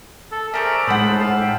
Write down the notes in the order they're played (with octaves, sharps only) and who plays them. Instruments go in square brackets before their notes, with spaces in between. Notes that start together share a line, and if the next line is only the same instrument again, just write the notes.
[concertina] A4
[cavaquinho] G#4 C5 C#6 [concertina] A#4 E5 [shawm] D5
[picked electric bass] A2 G#3 [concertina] A4 C5 [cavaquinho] F#5 D#6 [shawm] B5
[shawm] F4 [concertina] A5
[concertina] E5 [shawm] G5